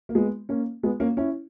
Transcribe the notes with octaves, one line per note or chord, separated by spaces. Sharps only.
A#3
G#3 B3
A#3 C#4
G#3 B3
A#3 C#4
C#4 E4